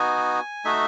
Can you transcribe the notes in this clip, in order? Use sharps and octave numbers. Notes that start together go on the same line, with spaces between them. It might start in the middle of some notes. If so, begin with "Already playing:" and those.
Already playing: B3 D#4 F#4 G#5
A3 D#4 F#4 E5